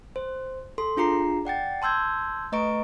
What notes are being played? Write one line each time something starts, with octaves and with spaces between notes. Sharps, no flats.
C5
A4 C6
D4 F4 G#4 A#5 C7
D5 F#5 G5 A6
A5 C6 E6 G6 G#6
A3 B4 D#5 A#5 C#6 D7